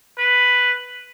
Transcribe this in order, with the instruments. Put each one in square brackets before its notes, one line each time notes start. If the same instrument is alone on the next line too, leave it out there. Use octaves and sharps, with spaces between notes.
[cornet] B4